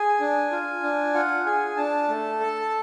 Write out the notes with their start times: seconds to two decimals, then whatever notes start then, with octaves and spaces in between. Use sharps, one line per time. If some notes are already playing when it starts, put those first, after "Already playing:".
Already playing: G#4 G#5
0.20 D4
0.52 F4
0.83 D4
1.14 F4 F#5
1.46 G#4 G#5
1.77 D4 A5
2.08 A3
2.40 A4